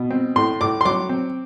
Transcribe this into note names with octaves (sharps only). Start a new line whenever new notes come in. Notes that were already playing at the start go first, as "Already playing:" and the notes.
Already playing: B2
C4
A2 C6
A2 D6
C6
F#3 D6
C4